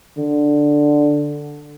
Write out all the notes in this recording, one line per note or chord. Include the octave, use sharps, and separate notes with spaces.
D3